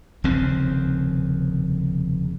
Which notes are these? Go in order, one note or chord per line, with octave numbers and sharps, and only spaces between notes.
F1 D#2 C#3 C4